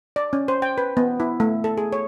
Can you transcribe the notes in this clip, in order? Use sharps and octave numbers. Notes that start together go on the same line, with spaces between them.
D5
C#4
C5
G5
B4
B3
E4
A3
A4
G#4
C#5